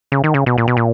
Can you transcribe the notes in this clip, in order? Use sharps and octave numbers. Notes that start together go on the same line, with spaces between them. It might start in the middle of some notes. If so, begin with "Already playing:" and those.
C#3
D#3
C#3
B2
A#2
B2
A#2